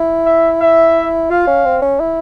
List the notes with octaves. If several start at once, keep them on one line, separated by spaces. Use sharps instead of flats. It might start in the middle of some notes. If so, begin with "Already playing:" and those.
Already playing: E4
E5
E5
F4 F5
C#4
C4
C#4
E4